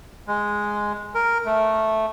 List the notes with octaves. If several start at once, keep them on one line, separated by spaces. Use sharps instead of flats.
G#3
A#4
A3